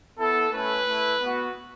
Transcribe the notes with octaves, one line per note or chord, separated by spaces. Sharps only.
B3 E4 A4
A3 C#4 E4 B4
A3 E4
B3 F#4